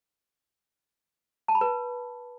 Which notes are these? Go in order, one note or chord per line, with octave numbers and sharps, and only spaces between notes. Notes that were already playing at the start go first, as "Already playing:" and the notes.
A5
B5
B4